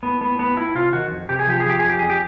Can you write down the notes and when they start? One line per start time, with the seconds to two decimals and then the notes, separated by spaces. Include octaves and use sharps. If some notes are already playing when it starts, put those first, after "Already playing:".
0.03 A2 B3
0.21 A2 B3
0.39 A2 B3
0.57 A2 E4
0.75 C3 F4
0.93 D#3 F#4
1.11 F2
1.29 C3 G4
1.39 G#4
1.47 F3 G4
1.60 G#4
1.66 F3 G4
1.79 F2 G#4
1.89 G4
1.99 F2 G#4
2.10 G4